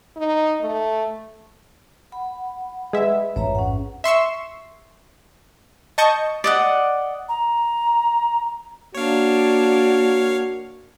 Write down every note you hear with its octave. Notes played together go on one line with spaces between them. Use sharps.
D#4
A3
F#5 B5
G#3 G#4 B4 E5
A1 F2 G#2 C#5 E5 A#5
C#4 F#5
E5 C6 C#6 E6
D#5 A5 C#6 G6 A#6
D5 D#5 F#5
A#5
A#3 D4 F#4 C#5 F5